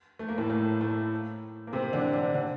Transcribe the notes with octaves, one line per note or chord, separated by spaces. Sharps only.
A3
A#3
A2 A3
A2 A3
A2 A3
A#3
C3 C4
D3 D4
D3 D4
D3 D4